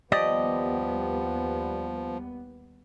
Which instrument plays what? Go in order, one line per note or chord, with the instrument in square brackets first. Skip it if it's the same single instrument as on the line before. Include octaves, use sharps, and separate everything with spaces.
[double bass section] D#2 G3 B3 [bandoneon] F3 [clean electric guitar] G4 D5 [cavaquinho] D#5